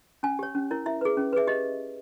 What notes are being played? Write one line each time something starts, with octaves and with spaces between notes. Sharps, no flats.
C#4 G#5
G4 C#5
C#4
E4 A#4 C#5
E4 E5
G#4 B4
C#4
G#4 B4 E5
G4 D#5